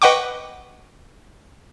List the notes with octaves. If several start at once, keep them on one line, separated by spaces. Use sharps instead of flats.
B4 D#5 F#5 G5 C#6 D6